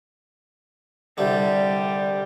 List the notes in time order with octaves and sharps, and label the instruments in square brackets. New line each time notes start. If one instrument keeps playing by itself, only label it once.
[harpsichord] C2 D3 [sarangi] G3